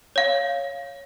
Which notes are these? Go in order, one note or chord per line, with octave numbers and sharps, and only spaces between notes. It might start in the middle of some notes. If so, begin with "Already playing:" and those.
C#5 F5